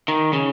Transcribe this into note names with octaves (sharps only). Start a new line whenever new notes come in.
D#3
C#3